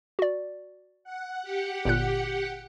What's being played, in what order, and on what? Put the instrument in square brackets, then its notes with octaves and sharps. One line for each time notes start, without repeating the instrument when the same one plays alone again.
[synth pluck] F#4 D5
[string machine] F#5
G4 F#5 C#7
[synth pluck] G1 A#2 F#6